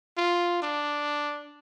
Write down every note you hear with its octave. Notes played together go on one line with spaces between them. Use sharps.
F4
D4